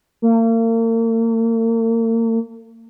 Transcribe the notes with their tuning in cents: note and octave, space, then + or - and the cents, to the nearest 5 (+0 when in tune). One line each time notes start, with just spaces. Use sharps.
A#3 -40